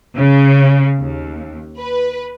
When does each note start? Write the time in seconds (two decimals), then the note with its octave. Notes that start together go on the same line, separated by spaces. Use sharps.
0.16 C#3
0.99 D#2
1.78 B4